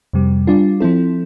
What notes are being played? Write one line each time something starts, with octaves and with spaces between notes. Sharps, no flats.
F2 C3 G3
G3 D4 F4
F3 C4 E4 A4